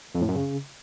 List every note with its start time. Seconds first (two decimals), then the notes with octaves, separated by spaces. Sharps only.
0.15 F2
0.22 A2
0.28 F#2
0.35 C#3